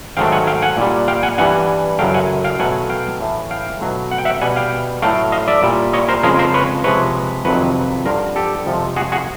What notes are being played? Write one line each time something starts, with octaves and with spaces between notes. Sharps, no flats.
G#2 D#3 F#3 A3 F5 G5
F#5 G#5
F5 G5
F#5 G#5
A#2 G3
F5 G5
F#5 G#5
G2 E3 G3 F#5 G#5
F#2 C#3 F#3 A3 F5 G5
F#5 G#5
F5 G5
B2 F#3 A3 F#5 G#5
F5 G5
A2 E3 A3
F5 G5
B2 F#3 A3
F#5
G5
E5 F#5
B2 G3 F#5 G#5
F5 G5
A2 F#3 A3 F5 G5
D#5 F5
D5 E5
A#2 G3
C#5 D#5
A#4 C5
F2 C#3 F3 G#3 G#4 A#4
A#4 C5
B4 C#5
C3 F3 G#3 B4 C#5
F2 C3 D#3 F#3 B4 C#5
G2 D3 F3 A#4 C5
G4 A4
F2 C3 F3 G#3
F#4 G#4
F#4 G#4